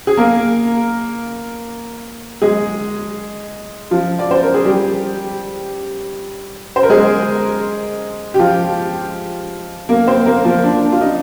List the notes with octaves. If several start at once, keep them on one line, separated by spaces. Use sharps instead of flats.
G#4
A#3 A#4
G#3 G#4
F3 F4
D5
C5
A#4
G#4
G3 G4
C5
A#4
G#3 G#4
G4
F3 F4
A#3 A#4
C4 C5
A#3 A#4
F3 F4
D4
F4
D#4